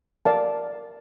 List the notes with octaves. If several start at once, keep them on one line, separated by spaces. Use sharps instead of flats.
A#4 D5 F5 A5